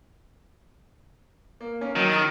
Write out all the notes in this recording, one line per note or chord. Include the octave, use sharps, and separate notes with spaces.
A#3
A#3 C#4
D#3 F#3
D#6 A6